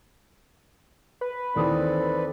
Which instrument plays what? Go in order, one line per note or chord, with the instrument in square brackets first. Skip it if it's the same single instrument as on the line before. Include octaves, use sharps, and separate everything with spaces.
[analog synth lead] B4
[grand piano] D#2 E3 D#6 [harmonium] C4 A4 D5